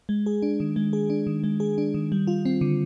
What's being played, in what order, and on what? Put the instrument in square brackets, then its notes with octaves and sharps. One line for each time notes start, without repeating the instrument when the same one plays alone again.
[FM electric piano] G#3
G#4
D4
D#3
G#3
G#4
D4
D#3
G#3
G#4
D4
D#3
G3
F4
C4
D3